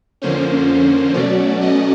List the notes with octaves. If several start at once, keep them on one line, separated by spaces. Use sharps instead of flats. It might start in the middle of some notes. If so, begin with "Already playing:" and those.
F2 D3 F3 A#3 C#4 C5
B2 F#3 A3 C#4 D5
D#5